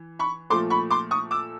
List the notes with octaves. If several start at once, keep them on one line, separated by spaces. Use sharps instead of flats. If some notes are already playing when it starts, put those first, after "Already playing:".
Already playing: E3
B5 C#6
A#2 F3 A3 C6 D6
B5 C#6
C6 D6
C#6 D#6
D6 E6